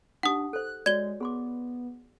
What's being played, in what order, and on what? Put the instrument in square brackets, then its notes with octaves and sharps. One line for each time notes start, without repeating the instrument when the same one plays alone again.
[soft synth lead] D4 [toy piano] D#4 G4 [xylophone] F#5 D#6
[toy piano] A4 C5 [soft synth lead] F#6
[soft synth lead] G#3 [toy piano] F#4 C#5 D5 [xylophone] G#6 G7
[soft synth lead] B3 [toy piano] G#4 C6 D6